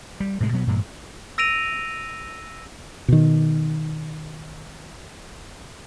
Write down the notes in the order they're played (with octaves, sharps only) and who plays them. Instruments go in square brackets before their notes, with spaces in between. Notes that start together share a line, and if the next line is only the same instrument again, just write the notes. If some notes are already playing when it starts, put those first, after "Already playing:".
[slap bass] G3
A2 C3 D#3 G#3
B2 F#3 G#3 B3
G2 A#2 E3 G#3
[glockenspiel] E6 A#6 D7 D#7 F7
[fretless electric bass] B2 D#3